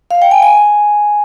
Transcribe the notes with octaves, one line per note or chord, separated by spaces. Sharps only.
F5
G5
G#5
G#5